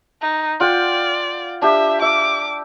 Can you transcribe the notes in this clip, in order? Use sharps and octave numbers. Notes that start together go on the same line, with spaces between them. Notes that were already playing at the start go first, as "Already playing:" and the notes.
D#4
F4 D5 F#5 G5
D4 G4 E5
E5 D6